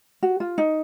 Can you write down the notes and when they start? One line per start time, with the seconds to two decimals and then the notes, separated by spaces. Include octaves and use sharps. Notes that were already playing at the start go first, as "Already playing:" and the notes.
0.23 F#4
0.40 F4
0.58 D#4